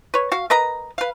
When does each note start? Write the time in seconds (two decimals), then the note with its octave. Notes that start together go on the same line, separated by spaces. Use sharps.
0.14 B4 C#5
0.32 F#4 F5
0.50 A#4 B4 D#5 A#5
0.98 B4 F5